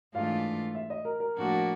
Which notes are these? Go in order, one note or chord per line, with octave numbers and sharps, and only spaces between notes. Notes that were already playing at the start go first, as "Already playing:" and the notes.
G#2 E3 A3 D4 F4 F5
E5
D#5
A#4
A#4
A2 F3 A#3 D4 F#4